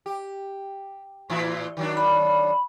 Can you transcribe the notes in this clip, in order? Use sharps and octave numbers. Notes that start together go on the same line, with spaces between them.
G4
A2 E3 E4
D#3 F#3 D4
B5